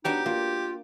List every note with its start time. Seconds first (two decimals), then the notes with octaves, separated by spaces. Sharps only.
0.05 B3 D4 D#4 F#4 G4
0.26 A#3 F4